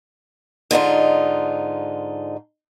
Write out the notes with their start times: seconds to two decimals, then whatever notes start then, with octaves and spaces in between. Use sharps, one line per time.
0.71 G#2 D3 D#4 F4